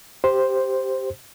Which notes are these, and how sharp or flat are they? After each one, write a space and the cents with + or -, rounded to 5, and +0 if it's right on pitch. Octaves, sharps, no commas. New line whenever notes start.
G4 +0 C5 +0